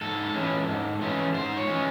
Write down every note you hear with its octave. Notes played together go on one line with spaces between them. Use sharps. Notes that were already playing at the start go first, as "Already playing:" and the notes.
G#2 A4
E3 G#3 C#4
G#2
E3 G#3 C#4
G#2 C5
C#5
E3 G#3 C#4